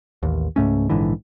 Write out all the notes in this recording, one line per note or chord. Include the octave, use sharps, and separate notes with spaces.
A1 D#2
C#2 G#2 A3 C#4
A#1 G#2 D3 E3